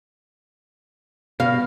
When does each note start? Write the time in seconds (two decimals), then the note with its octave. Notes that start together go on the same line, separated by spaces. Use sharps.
1.40 B2 F5